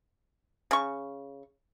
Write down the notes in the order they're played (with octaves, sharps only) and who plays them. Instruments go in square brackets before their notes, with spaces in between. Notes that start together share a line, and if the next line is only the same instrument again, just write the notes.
[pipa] C#3 C#6